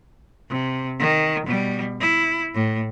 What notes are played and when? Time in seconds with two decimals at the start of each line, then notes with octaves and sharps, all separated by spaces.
0.50 C3
1.00 D#3
1.46 B2 G3
2.00 E4
2.55 A2